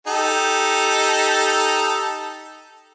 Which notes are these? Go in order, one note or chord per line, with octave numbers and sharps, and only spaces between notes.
D#4 G4 A4